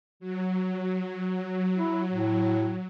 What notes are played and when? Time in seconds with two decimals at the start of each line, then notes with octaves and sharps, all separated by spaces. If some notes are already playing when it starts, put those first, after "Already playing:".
0.20 F#3
1.77 E4
2.12 A2